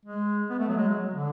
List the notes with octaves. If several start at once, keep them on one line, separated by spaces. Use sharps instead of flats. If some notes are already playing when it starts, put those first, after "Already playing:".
G#3
B3
A3
F#3
G#3
F#3
D3